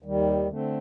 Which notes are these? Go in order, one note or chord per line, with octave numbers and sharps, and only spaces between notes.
D#2 D#3 G3
D3 A3 C4